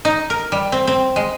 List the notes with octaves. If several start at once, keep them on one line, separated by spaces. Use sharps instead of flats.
D#4
A#4
G3
C4
C4
G#3